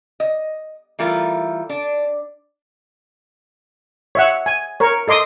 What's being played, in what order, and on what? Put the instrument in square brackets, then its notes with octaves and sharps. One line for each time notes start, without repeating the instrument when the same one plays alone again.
[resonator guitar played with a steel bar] D#5
E3 G3 A3 F4 A#4
D4
[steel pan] C#5 E5 F#5
G#5
A#4 C#5
A4 D#5 C6 D6 D#6